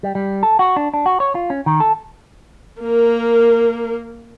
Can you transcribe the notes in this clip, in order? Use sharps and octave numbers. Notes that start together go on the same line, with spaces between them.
G3
G3
A4
F#4
D4
D4
F#4
C#5
F4
C#4
D#3
A4
A#3 A#4